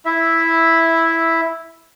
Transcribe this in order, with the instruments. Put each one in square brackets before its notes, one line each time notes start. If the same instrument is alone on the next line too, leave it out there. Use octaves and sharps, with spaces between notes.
[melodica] E4 E5